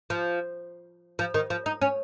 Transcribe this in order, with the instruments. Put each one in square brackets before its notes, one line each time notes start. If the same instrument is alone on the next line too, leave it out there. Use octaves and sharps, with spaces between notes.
[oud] F3
F3
D#3
F3
D#4
C#4